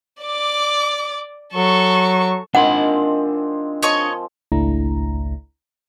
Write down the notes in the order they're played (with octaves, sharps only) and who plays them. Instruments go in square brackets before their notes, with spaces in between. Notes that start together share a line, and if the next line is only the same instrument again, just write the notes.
[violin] D5 D6
[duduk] F#3 [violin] A4 C#6
[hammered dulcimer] D#3 G#3 C4 [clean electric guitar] D4 F4 B5 [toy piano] F#5
[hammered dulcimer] F3 [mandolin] C#5 D#5 C#6
[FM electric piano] G#1 C#2 A3 D4 E4 A#5